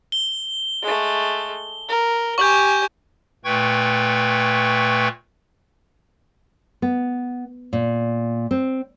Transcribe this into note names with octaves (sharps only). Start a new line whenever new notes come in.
G7
G#3 A3
A#4
G4 G#5 C#6 G6
A#2 A3 B4 G5 C#6 G#6
B3
A#2
C4